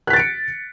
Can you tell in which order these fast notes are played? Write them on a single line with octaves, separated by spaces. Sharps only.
F#6 B6 A6 D7 C#7